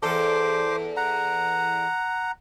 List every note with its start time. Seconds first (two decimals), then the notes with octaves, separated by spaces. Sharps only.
0.02 E2 A4 C5 D6
0.97 F#5 A#5